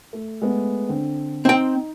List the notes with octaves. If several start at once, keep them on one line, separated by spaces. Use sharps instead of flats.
A3
G#3 A3 B3
D3 C4
C4 D#4 G5